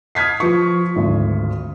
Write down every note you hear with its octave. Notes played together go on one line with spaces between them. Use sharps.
D#6 F6 G#6 B6 C7
F3 B4 C#6
G#1 D2